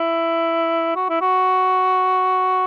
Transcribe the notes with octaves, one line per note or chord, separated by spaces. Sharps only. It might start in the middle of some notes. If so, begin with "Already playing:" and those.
Already playing: E4
F#4
E4
F#4